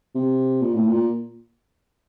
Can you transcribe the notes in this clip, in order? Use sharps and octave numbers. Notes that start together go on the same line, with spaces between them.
C3
A#2
A2
A#2